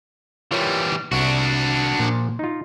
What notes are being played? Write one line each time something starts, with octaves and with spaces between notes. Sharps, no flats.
E3 G3 F4 A#4 C#5
C2 D4 F#4
A#2 F3
D#4 F4